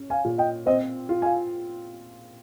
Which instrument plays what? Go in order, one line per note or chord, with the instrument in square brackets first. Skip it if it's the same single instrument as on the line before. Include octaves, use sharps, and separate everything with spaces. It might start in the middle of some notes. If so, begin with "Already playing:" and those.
Already playing: [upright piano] C#4
[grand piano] F5 G#5
[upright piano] A#2
[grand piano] D#5 G5
[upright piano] C4 [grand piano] C5 D#5
[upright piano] F4
[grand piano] F5 G#5